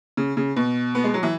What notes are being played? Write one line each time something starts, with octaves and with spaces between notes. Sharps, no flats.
C#3
C#3
B2
B3
G#3
F#3
E3